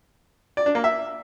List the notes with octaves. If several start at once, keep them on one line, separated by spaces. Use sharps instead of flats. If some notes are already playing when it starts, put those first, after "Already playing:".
D5
D4
A#3
E5